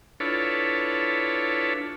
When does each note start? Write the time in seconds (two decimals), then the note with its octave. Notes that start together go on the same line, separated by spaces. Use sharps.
0.20 D4 E4 F4 A4 B4 C#5